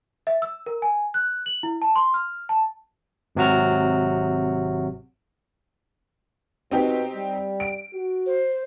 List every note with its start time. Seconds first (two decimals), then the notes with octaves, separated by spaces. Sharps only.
0.27 E5
0.42 E6
0.66 A#4
0.82 G#5
1.14 F#6
1.46 F#7
1.63 E4
1.82 A5
1.96 C6
2.14 F6
2.49 A5
3.35 G#1 C3 F#3 F#4 F6
6.71 B2 C4 D#4 G4
7.15 G3
7.60 D7
7.93 F#4
8.26 C5